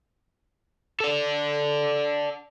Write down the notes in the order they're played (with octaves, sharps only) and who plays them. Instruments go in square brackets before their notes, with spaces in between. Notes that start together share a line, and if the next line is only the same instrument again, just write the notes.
[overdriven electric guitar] A4 D5